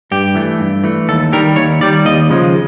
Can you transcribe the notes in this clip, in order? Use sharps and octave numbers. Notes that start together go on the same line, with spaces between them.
G2 G4
E3 A3
G2
E3 A3
D#2 A4
D#3 G3 A#4
D#2 C#5
D#3 G3 D5
D#2 D#5
C#3 F3 G#3